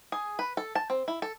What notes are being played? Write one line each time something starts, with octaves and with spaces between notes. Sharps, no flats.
G#4
B4
A4
A5
C4
E4
A4